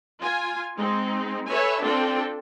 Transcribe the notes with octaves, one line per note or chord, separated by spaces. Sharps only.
F4 G#5
G#3 C4 D#4
A4 B4 C#5 E5 G#5
C4 D4 F4 A4 G5